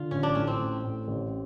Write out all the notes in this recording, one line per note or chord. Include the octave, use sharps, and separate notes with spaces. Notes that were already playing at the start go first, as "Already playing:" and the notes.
Already playing: D3 F4
A1 C#4
D4
A2 C#4
C4
A1
A2
A1